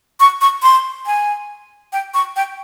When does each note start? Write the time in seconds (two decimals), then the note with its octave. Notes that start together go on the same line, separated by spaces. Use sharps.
0.20 C#6
0.41 C#6
0.63 C6
1.06 G#5
1.93 G5
2.14 C#6
2.36 G5